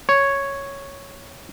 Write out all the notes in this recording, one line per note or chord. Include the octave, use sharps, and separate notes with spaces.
C#5